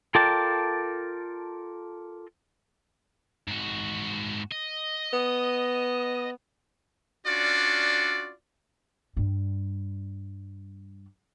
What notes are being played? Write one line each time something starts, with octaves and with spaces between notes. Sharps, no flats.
F4 A4 A#4 D5 G5 A5
G#2 F#4
D#5
B3
C#4 D4 F4 F#4 D5
G2 G3